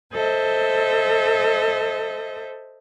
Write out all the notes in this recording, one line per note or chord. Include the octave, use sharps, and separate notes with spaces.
A4 C5 D#5 E5